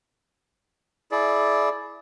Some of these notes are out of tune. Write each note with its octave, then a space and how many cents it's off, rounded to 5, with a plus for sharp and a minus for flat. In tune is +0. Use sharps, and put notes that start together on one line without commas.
E4 +0 G#4 +35 D5 +0